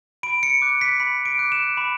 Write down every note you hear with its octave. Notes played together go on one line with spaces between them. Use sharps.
B5 D7
C#7
D6 F#6
B6
B5 B6
D7
D6 F#6
E7
B5